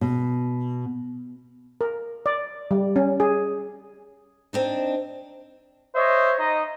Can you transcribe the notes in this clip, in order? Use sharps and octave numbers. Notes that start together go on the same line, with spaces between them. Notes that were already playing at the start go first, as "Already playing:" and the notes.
B2
A#4
D5
G3
C#4
G#4
C4 D4 D#4
C5 C#5 D#5 E5
D#4 D#5